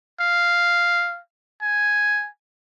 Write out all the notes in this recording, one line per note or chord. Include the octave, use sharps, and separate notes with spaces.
F5
G#5